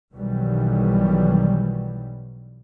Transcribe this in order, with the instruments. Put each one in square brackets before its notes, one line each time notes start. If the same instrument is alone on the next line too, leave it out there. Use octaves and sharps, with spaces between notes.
[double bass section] B1 D#3 E3 F#3 G3